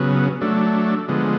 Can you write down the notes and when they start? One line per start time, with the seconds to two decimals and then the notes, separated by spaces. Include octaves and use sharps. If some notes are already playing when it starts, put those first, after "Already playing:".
Already playing: C#3 F#3 B3
0.41 F#3 A3 D4
1.08 D3 F3 G#3 B3